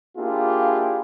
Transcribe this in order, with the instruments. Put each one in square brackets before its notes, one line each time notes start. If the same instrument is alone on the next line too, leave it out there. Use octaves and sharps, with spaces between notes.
[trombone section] A#3 D4 E4 F4 G4 G#4